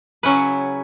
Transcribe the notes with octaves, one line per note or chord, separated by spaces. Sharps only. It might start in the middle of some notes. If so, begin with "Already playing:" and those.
C#3 F#3 C#4 E4 B4